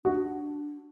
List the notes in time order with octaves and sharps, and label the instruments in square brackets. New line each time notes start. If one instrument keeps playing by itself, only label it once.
[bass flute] D4 [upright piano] F#4